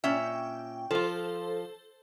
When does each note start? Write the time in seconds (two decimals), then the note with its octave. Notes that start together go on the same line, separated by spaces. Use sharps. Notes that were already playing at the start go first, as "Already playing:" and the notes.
0.04 A#2 C#4 E5 G5
0.91 F3 F4 A4 C5